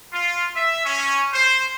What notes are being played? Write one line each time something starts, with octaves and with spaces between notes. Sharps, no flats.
F4
E5
C#4
C5